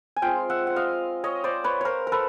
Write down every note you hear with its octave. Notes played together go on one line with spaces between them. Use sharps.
G#5
G#3 C4 F4 F5 G5
E5 F#5
F#5
D#5 F5
C#5 D#5
C5 D5
B4 C#5
A#4 C5 C#5
A#4
A4 B4